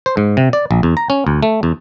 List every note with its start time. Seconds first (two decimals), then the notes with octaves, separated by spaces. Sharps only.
0.06 C5
0.17 G#2
0.37 C3
0.53 D5
0.71 A#1
0.83 E2
0.97 A#5
1.10 C#4
1.27 D2
1.43 A3
1.63 E2